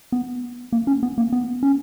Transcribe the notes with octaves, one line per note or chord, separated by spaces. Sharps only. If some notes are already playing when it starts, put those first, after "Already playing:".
B3
A#3
C#4
B3
A#3
B3
C#4